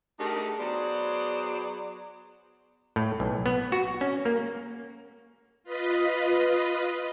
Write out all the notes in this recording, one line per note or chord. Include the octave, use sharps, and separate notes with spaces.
A3 D4 D#4 G4 G#4 A#4
F#3 B3 G#4 C5 D5
A2
B1
B3
F#4
C#4
A#3
F4 B4 D#5 B6